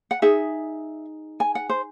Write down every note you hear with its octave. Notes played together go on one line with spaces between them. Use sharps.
F#5
D#4 G#4 E5
G#5
F#5
C5